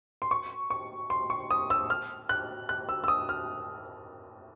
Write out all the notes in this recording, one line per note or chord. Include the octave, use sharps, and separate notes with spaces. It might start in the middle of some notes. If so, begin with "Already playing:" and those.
C6
C#6
C#6
C6
C#6
D#6
E6
F6
F#6
F#6
E6
E6
D#6
F6